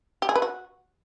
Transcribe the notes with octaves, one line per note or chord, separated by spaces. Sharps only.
G4
G#4
B4
F#4